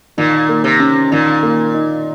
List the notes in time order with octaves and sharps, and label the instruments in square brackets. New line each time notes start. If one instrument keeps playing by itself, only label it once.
[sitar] A#2 [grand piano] D#3
[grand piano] A#3
[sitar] C3
[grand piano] C#4
[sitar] A#2 [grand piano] D#3
[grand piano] A#3
D#4